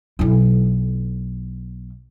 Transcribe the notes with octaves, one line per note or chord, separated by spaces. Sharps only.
B1 E4